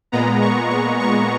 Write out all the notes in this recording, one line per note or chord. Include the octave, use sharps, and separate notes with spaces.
A#2 G#3 B3 A#5
C#6
C#6
C#6